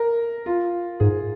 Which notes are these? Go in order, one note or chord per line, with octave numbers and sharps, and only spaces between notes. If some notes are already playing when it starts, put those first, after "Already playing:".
Already playing: A#4
F4
G#2 G#4